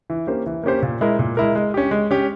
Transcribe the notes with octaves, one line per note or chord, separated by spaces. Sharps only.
E3
A#3 C#4 G4 C5
E3
A#3 C#4 G4 C5
A#2
G#3 E4 A#4
A#2
G#3 E4 A#4
G#3
C#4 G4
G#3
C#4 G4